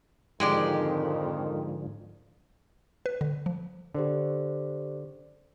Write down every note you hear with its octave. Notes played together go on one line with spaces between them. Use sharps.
F2 G#2 D3 D#3 F3 G#3 G4 D5
B4
D3
F3
D3 G4 C5 D5